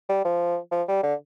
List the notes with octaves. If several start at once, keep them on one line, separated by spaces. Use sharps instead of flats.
G3
F3
F3
G3
D3